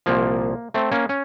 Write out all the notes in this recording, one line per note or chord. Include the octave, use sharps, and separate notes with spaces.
C2 A#2 F3 A#3
A3 C4
A#3 C#4
C#4